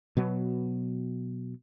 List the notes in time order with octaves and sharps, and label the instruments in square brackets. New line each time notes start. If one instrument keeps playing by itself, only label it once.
[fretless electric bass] B2 F#3 B3